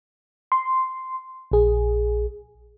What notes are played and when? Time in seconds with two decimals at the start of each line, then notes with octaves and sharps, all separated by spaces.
0.52 C6
1.51 A#1 G#4